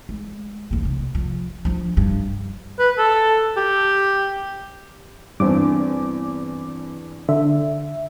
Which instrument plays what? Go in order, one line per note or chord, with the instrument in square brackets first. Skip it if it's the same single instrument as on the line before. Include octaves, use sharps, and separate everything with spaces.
[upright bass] G#3
E2 A#3
B1 C3
F3
F3 D4
G2
[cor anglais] B4
A4
G4
[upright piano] E2 D4 [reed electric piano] G2 C4 [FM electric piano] D6
[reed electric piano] D3 [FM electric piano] E5